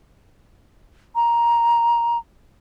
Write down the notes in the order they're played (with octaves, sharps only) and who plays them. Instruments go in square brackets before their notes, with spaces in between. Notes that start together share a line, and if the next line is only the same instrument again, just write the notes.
[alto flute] A#5